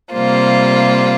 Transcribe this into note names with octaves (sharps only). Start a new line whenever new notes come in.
C3 G3 A#3 F4 C5